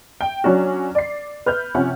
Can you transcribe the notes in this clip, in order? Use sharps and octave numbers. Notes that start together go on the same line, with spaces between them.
G5
F#3 C#4 D4 F#4
D5 C7
B4 F6 G6
C3 F3 C#4 F#5